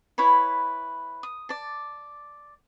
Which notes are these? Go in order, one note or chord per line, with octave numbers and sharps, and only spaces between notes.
E4 B4 C#5 B5
D#6
D5 A5